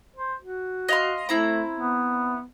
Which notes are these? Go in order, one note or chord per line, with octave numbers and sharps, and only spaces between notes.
C5
F#4
D#5 F5 C6
A3 C4 E4 A#5
B3